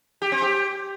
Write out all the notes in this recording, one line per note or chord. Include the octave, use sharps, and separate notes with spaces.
G4
C4
G4